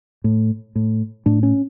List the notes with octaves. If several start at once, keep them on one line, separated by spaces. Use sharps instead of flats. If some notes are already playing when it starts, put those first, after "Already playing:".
A2
A2
A2 D4
C#4